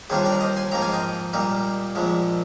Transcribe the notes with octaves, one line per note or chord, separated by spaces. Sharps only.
D#2 D#3 G3 D4 F4 G#4 C5
A#4 D5
C5 D#5
G#5 C6
G#2 F3 A#3 F4 G5 A#5
F5 G#5
D#5 G5
A#2 G3 A#3 D#4
A#1 A#2 F3 G#3